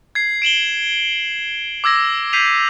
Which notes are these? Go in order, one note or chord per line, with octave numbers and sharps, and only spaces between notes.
G#6 C7
D7 E7 F#7 G7
D6 E6 G#6 A#6
G6 B6 C7 D#7 F7